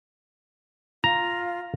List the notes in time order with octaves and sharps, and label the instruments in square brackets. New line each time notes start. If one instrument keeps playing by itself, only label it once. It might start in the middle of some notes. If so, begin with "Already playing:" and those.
[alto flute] F4 [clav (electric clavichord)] A#5